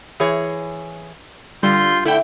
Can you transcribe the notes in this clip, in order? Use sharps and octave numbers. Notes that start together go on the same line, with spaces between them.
E3 G#4 C#5
D3 G3 F4 C6 G6
D3 A3 E4 G5